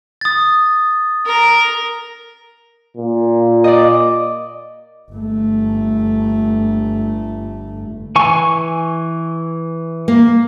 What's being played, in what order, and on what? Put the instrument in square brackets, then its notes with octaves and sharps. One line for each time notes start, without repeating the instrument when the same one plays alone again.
[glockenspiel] D#6 A6
[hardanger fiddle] A#4
[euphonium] A#2
[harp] D5 D#5
[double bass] G1 A3
[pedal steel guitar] E3 G#5 C#6
[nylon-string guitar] A#3